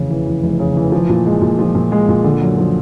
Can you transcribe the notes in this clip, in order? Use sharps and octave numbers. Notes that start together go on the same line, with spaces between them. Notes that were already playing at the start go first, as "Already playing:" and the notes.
Already playing: F1 E2 C#3
E3
E2
F1
C#3
E3
F3
A#2
G#3
A#2
F3
A#2
G#3
A#2
D3
F#2
F3